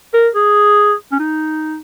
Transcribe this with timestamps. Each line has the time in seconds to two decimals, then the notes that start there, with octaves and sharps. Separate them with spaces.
0.14 A#4
0.35 G#4
1.12 C#4
1.19 D#4